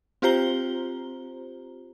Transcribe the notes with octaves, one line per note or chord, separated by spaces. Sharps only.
C4 F4 G4 C5 A#5 G7